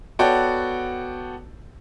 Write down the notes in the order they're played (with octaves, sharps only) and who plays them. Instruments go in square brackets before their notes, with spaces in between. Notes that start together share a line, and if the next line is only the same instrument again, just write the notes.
[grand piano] B3 F#4 A4 C#5 D5 G5